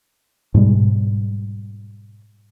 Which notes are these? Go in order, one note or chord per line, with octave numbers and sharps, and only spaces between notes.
G#2 B2 G3 G#3